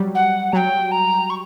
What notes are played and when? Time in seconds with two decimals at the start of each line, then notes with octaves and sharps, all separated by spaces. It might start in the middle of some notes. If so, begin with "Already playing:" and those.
Already playing: F#3 G3
0.15 F#5
0.52 F#3 G5 A#5
0.91 A#5
1.30 C#6